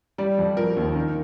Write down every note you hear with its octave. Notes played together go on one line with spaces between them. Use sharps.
G3 D5
F2
F3 A#4
D#2
D#3